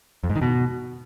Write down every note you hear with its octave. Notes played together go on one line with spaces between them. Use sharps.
F2
G#2
D#3
B2